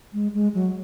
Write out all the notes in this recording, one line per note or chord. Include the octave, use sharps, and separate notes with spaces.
G#3
G#3
F#3